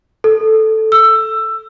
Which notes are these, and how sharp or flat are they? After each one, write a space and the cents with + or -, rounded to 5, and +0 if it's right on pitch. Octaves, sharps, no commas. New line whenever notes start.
A4 -5
E6 +15